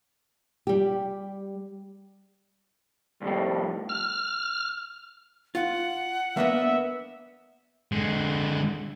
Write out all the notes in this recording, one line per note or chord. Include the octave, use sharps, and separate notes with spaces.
G3 G4
C2 F2 A2 G3
F6
F4 F#5
A#3 B3 D4 E5
D3 G#3